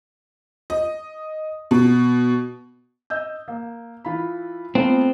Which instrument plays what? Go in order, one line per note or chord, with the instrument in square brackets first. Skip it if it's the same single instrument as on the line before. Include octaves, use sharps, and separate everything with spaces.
[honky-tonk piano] D#5
B2
[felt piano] D#5 E6 G6
A#3
E3 F4 B5
[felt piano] A3 B3 F4 [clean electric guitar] C4